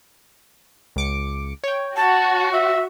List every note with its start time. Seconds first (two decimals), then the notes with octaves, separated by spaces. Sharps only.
0.96 C#2 D6 C#7
1.64 C#5 G5
1.96 F#4 A5
2.53 E5